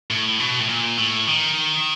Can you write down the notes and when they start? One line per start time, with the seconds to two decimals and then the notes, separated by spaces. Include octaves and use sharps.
0.10 A2
0.40 B2
0.60 A2
0.69 A#2
0.98 A2
1.27 D#3